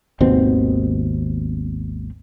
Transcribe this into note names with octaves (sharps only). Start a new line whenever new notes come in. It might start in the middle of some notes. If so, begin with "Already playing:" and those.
G#1 D#2 B2 C4